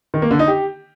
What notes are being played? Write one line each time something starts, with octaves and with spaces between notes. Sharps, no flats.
D#3
A#3
D3
D#4
G4